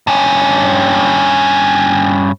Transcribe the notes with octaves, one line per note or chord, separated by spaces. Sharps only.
G2 C#4